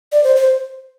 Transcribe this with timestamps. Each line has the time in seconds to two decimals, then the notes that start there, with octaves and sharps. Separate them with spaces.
0.12 D5
0.24 C5
0.36 C5